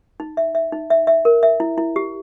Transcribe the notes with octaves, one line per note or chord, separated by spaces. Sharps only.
D#4
E5
E5
D#4
E5
E5
A#4
E5
E4
E4
G4